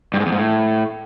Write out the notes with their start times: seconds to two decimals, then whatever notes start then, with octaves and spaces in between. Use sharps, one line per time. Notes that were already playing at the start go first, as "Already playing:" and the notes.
0.14 G2
0.20 G#2
0.26 E2
0.32 G#2
0.38 A2